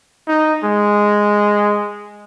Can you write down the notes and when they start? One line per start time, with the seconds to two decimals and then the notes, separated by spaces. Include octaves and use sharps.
0.28 D#4
0.64 G#3